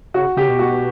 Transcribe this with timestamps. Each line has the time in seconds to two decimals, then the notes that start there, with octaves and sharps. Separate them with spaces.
0.14 C#3 F#4
0.37 C#3 G4
0.49 B2
0.59 F#4